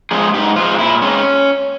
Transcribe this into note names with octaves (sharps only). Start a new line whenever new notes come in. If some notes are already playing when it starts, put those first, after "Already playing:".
F3 G#3 C4 G#4
G#2 G4
F3 G#3 C4 F4
A#2 E4
G#3 C4 C#4